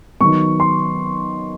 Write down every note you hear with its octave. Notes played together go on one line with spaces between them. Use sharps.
D#3 F#3 B3 C#6
C6